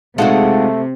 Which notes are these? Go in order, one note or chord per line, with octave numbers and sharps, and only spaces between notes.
C3 G#3 A3 D#4 F4 F#4 A4 F#5